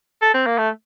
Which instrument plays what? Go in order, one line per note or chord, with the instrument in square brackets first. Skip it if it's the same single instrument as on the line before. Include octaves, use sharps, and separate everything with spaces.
[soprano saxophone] A4
C4
A#3
A3